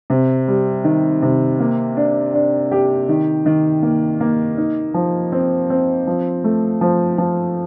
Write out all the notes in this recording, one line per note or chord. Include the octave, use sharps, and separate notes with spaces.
C3
G3
D#3
C3
A#3
D4
D4
G4
D#3
D#3
A#3
A#3
D#4
F3
C4
C4
F3
A3
F3
F3